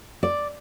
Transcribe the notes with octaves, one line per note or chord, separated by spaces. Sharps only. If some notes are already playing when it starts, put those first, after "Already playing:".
D5